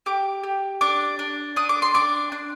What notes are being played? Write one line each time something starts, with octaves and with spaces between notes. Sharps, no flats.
G4 D6
G4
D4 D6
D4
D4 D#6
D6
C6
D4 D6
D4